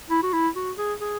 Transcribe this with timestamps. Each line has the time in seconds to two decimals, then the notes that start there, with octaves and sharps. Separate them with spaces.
0.10 E4
0.22 F#4
0.32 E4
0.56 F#4
0.77 G#4
1.01 G#4